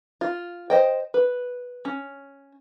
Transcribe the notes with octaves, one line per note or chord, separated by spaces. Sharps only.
F4
C5 D#5 G5
B4
C#4